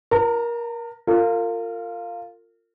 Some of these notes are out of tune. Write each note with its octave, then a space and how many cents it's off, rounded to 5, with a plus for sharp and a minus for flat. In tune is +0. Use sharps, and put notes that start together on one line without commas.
A#4 +20 A#5 -45
F4 +0 A#4 -40